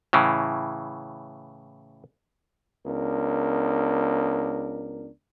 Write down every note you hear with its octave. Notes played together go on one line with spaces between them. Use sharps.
A2 C#3 E3
C#2 B3 D4 A#4